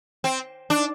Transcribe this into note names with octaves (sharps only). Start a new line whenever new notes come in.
C4
D4